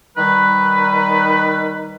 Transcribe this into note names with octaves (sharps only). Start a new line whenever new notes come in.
D#3 G3 B4